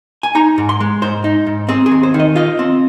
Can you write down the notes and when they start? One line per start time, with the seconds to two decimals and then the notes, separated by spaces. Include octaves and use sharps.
0.23 G#5
0.35 D#4 A#5
0.58 G#2
0.69 C6
0.80 G#3
1.02 G#2 C5
1.24 D#4
1.47 G#2
1.69 C4 G#4
1.86 G#4
1.91 D#2
2.03 C5
2.14 D#3
2.20 D#5
2.36 F4 D#5
2.59 C4